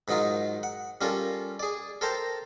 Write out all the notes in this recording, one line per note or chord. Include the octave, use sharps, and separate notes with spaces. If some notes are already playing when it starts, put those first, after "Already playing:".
G#2 D#3 F#3 D#4 F4
F#5
G3 C#4 F4 A4 A#4
G#4 D5
A4 A#4 C5 G5 A5 A#5